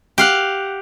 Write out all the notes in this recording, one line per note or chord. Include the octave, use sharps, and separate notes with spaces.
G4 F5 F#5